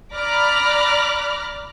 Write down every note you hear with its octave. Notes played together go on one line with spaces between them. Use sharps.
D5 A#5 B5 D6 F6 F#6